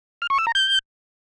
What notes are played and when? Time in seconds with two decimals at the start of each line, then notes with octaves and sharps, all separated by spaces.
0.22 F6
0.30 C#6
0.38 E6
0.47 A#5
0.55 G6